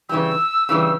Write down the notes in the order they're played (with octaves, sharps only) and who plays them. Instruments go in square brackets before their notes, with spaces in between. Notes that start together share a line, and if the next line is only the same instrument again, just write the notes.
[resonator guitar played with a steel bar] C#3 E3 G3 [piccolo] E6
[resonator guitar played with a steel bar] C#3 E3 G3